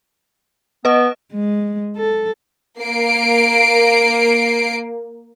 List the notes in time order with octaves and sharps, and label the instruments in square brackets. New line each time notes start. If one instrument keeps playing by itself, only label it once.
[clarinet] B3 [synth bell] B4 D#5
[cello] G#3
A4
[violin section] A#3 C7 D7